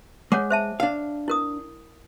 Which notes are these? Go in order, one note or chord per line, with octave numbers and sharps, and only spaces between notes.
G#3 C#5 F#5 D6
C5 E5 A5
D4 F5
E4 A#4 D#6